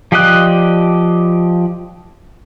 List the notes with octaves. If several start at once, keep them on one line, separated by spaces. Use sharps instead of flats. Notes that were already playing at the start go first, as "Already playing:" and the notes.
F3 G4 D5 D#5 F#6